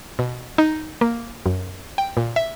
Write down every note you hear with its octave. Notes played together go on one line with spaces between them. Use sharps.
B2
D#4
A#3
F#2
G5
A#2
E5